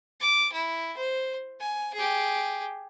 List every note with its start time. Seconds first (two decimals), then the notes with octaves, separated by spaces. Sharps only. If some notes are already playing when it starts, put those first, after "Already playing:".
0.21 D6
0.52 E4
0.97 C5
1.60 G#5
1.94 G4 G#4